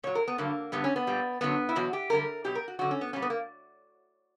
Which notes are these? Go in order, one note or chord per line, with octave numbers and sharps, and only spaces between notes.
A#2 F#3 C#5
A#4
B3
G2 D3 F#3 A#3
G2 D3 G3 B3
C#4
B3
A#2 G3
F#2 D3 F#3 B3
E4
E2 B2 F#3 F#4
G4
F#2 D3 G3 A#4
B2 F#3 G4
A#4
F#4
F#2 D3 F#3 F#4
C#4
B3
A#2 G3 C#4
B3
A#3